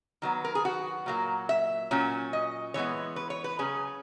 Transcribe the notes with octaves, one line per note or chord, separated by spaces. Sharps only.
D#3 F#3 B3
A#4
G#4
F#4
A#2 F#3 A#3
E5
A#2 F#3 C#4
D#5
E3 G#3 B3 C#5
B4
C#5
B4
C#3 F#3 C#4 G#4